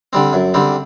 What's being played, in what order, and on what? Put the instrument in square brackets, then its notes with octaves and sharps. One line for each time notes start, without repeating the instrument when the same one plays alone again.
[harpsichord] D3 G3 C4
F#2
D3 G3 C4